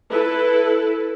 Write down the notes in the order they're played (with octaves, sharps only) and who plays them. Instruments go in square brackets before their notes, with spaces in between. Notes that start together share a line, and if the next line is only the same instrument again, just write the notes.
[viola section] E4 A4 B4